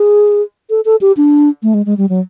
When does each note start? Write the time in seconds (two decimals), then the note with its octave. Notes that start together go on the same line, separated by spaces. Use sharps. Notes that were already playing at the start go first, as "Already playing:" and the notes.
Already playing: G#4
0.70 A4
0.85 A4
1.01 G4
1.17 D4
1.63 A3
1.74 G#3
1.86 G#3
1.98 G3
2.09 F#3